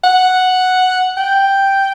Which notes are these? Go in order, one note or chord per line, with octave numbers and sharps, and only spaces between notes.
F#5
G5